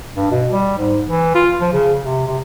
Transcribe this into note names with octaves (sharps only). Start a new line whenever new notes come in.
G2
B2
G3
G#2
E3
F4
F3
C#3
C3
C3